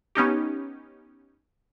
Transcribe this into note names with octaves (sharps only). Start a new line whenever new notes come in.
B3 C#4 D#4 G4